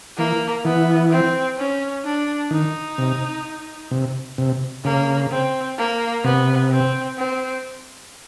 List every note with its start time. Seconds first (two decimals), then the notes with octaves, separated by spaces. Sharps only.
0.18 E3 A#3
0.65 E3 B3
1.11 C4
1.58 C#4
2.04 D4
2.51 D#3 D#4
2.98 C3
3.91 C3
4.38 C3
4.84 C#3 A#3
5.31 C4
5.78 A#3
6.24 C3 B3
6.71 C4
7.18 C4